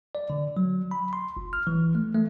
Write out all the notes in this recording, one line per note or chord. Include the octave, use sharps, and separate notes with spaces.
D5
D3
F#3
B5
C6
G1
F6
E3
A3
A3